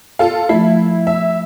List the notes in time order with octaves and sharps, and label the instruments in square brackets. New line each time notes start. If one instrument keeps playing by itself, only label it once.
[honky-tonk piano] F4 A4 F5
[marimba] F3 A3 [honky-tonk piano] E4
[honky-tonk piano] E5